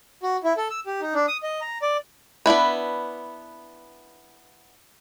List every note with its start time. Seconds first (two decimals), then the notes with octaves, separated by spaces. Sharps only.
0.23 F#4
0.44 E4
0.57 A4
0.70 E6
0.86 G4
1.01 D#4
1.14 D4
1.28 D#6
1.43 D#5
1.61 A#5
1.82 D5
2.46 B3 D4 E4 B4